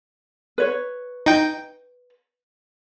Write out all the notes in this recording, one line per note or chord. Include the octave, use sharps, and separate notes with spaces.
B4 C#5
D#4 G5